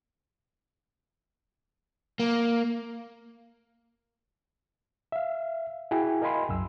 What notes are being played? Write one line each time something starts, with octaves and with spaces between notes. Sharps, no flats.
A#3
E5 F5
E4 F#4 G#4 G5 G#5
A#4 D#5 F5 G#5 B5 C6
C2 F#2 E6